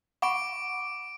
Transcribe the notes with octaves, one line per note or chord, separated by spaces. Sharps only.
F#5 B5 C#6 D6 D7